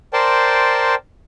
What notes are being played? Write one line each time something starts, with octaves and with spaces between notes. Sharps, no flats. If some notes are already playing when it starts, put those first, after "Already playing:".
A#4 C5 D5 G5 A5 C6